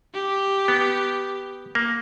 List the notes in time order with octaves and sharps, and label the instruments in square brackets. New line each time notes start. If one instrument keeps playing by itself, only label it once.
[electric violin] G4
[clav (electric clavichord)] B3
A#3